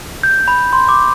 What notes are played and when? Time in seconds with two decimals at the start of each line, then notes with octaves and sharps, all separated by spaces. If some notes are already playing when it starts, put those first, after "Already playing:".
0.23 G6
0.48 B5
0.73 C6
0.89 D6